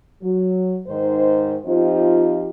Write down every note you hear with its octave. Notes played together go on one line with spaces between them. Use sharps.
F#3
G#2 D#3 C5
F3 C4 D#4 F4 G4